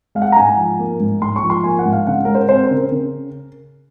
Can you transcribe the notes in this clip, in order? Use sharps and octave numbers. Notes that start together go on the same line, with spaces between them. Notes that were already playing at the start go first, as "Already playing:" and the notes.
G#3 F5
F#5
A#5
G#2 G#5
F3
A#3
G#2
G#2 C6
C#6
F3
C6
A#3 G#5
F#5
G#2
F5
C#3 F#5
G#3 A#4
C5
C4 C5
A#4
C#3
A#4
C#3